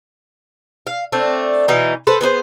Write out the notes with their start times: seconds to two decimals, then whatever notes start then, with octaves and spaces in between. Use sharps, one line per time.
0.87 F5
1.12 A3 C4 D4
1.68 B2 E3 D#4
2.07 A4 B4 C5
2.21 B3 G#4 B4 C5